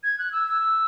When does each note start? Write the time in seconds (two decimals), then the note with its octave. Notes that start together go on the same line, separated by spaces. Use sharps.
0.03 G#6
0.19 F#6
0.32 E6
0.48 E6